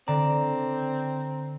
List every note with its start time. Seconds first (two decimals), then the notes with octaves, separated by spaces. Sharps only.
0.08 D3 C4 D5 A#5